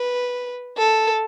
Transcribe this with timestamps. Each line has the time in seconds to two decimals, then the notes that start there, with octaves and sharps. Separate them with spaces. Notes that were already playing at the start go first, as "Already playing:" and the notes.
Already playing: B4
0.78 A4